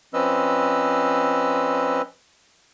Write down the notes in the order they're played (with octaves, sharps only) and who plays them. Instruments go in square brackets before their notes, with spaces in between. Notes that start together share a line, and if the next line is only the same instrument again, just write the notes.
[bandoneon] F3 C4 C#4 B4 D#5 E6